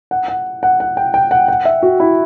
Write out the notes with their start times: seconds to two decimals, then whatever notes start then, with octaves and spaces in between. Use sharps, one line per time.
0.11 F#5
0.28 F#5
0.63 F#5
0.80 F#5
0.97 G5
1.14 G5
1.31 F#5
1.48 F#5
1.65 E5
1.82 F#4
2.00 E4